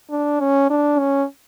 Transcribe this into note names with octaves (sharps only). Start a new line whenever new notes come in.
D4
C#4
D4
C#4